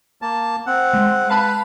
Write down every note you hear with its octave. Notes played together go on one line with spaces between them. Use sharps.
A#3 A5
C4 F#5
G#3
B4 F5 A5 B5